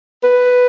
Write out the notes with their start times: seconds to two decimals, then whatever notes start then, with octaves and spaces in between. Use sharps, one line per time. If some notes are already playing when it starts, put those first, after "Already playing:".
0.24 B4